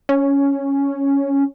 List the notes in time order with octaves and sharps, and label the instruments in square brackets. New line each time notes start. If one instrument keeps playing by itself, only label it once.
[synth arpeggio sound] C#4